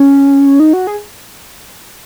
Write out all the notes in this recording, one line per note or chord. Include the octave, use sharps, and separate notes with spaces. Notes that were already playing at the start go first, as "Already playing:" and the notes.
Already playing: C#4
D#4
F#4
G#4